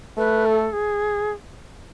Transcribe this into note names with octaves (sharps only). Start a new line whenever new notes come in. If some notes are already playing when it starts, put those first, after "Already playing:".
A3 B4
A4
G#4